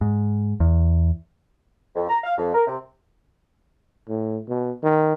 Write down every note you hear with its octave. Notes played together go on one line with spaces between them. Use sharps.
G#2
E2
F2
A#5
F5
F2
A#4
C3
A2
B2
D#3